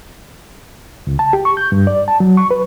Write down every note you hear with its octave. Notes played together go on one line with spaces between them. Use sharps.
C#2
A5
G4
C#6
G6
G2
D5
A5
F#3
C#6
B4